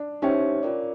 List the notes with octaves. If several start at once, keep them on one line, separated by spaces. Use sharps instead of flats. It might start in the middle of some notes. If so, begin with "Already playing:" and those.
Already playing: D4
C#4 D#4 G4 C5 E5 G5
F4 A#4 D5